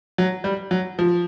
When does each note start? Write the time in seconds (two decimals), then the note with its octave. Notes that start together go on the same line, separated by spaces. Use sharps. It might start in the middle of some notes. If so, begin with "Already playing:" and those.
0.18 F#3
0.44 G3
0.71 F#3
0.99 F3